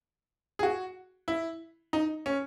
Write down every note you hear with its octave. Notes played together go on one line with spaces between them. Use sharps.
G#4
F#4
E4
D#4
C#4